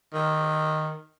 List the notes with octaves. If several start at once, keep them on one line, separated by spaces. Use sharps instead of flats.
D#3